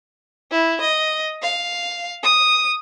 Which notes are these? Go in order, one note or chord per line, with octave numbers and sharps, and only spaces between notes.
E4
D#5
F5
D#6